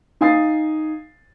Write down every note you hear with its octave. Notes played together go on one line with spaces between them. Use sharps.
D#4 F5 G#5 D#6 A6 C7